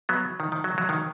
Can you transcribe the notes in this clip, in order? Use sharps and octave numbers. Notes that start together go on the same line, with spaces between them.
F#3 B3
D#3
D#3
F#3
F#3
D#3